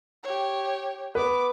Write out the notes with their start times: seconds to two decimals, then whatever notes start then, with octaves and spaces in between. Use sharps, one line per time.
0.24 G4 C#5
1.15 B3 B4 D6